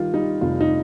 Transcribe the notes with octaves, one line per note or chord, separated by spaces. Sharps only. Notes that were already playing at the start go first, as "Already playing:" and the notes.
Already playing: D#3 G3 F4
G3 D#4
F1 F4
D#4